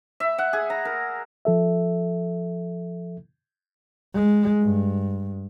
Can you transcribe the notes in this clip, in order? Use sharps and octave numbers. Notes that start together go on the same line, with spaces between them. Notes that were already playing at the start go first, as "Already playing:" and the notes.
E5
F#5
G#4
A#5
A#4
F3 A4 E5
G#3
G2